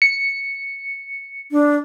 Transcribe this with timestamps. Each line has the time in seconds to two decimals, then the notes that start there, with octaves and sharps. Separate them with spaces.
0.02 C#7
1.52 D4